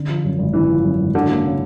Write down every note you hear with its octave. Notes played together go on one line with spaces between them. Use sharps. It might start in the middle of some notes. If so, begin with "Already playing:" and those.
Already playing: D3
F3
F#2
G#1
D3 E3
F3
F#2
G#1
D3 F#3
A#3
C#3